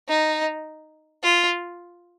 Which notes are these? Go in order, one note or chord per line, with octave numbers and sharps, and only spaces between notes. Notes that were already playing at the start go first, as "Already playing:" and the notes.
D#4
F4